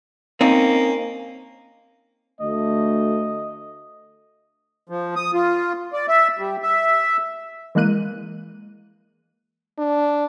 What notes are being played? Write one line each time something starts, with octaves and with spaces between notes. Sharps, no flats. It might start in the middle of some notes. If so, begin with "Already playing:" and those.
A#3 C4 C#4 D#4
D2 A3 D#5
F3
D#6
F4
D5
E5
G3
E5
E3 G#3 A#3 F#6 D#7
D4